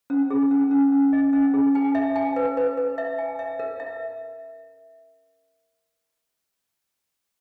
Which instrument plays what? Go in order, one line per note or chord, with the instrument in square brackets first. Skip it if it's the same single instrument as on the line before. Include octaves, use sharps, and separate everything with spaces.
[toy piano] C#4
G#4
C#4
C#4
C#4
D#5
C#4
G#4
G#5
E5
G#5
B4
B4
B4
E5
G#5
E5
A#4
E5